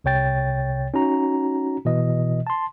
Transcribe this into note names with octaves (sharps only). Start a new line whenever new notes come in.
C2 C3 C#5 G5 A6
C#4 D#4 F#4 A#5
B2 E3 D#5
A5 C6